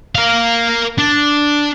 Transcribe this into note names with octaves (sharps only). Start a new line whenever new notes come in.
A#4 F5
D4